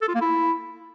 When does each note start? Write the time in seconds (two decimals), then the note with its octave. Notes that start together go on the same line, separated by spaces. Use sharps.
0.02 A4
0.08 F4
0.15 A#3
0.21 E4